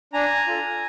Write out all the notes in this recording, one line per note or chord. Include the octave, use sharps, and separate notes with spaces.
D4 G#5 A#5
F4 A4